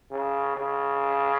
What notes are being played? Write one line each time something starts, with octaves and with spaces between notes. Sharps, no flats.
C#3
C#3